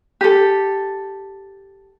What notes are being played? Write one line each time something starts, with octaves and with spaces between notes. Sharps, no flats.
G4 A4